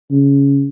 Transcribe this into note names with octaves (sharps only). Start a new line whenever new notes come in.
C#3